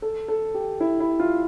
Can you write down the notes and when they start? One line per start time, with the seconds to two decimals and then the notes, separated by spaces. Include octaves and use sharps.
0.02 A4
0.28 A4
0.54 G4
0.80 E4
1.00 E4
1.20 F4